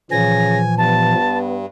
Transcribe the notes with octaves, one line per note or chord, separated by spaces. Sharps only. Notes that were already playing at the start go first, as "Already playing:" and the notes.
A#2 C#3 E3 F3 G#5 A#6
G2 B3 A5